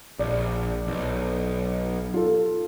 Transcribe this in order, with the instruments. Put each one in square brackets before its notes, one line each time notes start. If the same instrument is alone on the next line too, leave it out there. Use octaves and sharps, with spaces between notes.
[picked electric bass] A#1 [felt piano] D5
[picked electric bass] B1
[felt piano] F4 A4